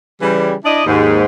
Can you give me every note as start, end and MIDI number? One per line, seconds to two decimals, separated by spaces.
0.21 0.54 49
0.21 0.54 52
0.21 0.54 55
0.65 0.85 62
0.65 0.85 64
0.65 0.85 74
0.65 0.85 75
0.86 1.25 39
0.86 1.25 44